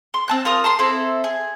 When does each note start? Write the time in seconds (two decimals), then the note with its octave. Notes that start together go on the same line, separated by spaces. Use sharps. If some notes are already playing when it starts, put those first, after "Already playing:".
0.14 C6
0.28 C4 A5 F#6
0.45 F4 A#4 D#6
0.64 A5 A#5 C6
0.79 C4 E4 A4
1.24 G#4